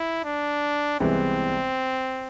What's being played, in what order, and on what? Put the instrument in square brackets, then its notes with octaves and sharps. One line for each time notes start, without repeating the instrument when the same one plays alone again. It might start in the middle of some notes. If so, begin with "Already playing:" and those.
Already playing: [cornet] E4
D4
[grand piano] C2 C3 E3 G#3 B3 [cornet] C4